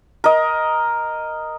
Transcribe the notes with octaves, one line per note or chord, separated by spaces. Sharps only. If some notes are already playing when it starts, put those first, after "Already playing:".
A#4 D#5